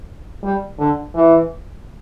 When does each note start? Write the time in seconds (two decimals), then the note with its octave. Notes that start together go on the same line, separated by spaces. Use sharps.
0.43 G3
0.79 D3
1.15 E3